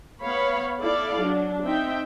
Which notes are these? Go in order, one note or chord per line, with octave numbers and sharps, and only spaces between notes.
B3 C#5 F5 B5
E4 A4 D5 F5
F#3 D4
C4 D#4 E5 G5